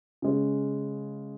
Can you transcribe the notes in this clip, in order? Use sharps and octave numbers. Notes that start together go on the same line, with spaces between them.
C#3 G#3 C#4